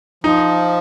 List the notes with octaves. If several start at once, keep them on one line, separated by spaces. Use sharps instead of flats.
F3 D#4